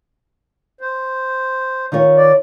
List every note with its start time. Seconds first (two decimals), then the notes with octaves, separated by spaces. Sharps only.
0.81 C5
1.92 D#3 F4 C#5
2.17 D5